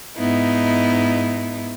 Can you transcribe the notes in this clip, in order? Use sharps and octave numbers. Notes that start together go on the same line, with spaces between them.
G#2 B3 D#4 E4